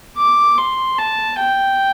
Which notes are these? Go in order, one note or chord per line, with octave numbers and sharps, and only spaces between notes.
D6
C6
A5
G5